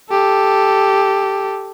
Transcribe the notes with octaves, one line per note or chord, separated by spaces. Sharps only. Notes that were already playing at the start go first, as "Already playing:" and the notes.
G4 A4